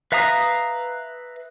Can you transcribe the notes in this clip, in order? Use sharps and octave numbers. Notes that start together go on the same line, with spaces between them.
B4 E5 F5 A#5 D#6